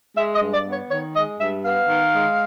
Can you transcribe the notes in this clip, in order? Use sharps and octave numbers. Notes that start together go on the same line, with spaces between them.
G#3 E5
D#5
G2
D5
B3
C#5
D#3 C#5
G#3 D#5
G2 E5
B3 F5
D#3
G#3